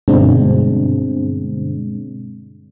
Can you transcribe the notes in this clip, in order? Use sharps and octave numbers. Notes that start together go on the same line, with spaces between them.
G2 B2 D3 G#3 C4 D4